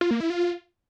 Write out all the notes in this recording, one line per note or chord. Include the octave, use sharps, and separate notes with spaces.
F4
A#3
E4
F4